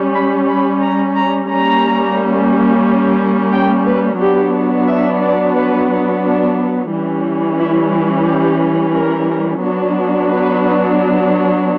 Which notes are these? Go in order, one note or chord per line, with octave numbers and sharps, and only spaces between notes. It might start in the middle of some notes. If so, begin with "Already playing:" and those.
Already playing: G3 C#4
B5
B5
A#5
A#5
G3 A#3 C#4 A#5
G5
B4
F#3 B3 D4 G4
E5
D5
B4
D4
E3 G3 C#4
E4
E4
G4
A#4
F#3 B3 D4
B4